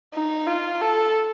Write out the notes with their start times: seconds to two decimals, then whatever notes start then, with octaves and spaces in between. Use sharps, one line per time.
0.14 D#4
0.47 F4
0.81 A4